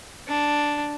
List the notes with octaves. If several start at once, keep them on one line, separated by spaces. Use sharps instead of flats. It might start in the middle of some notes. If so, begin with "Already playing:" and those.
D4